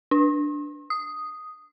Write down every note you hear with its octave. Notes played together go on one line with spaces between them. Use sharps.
D4
D#6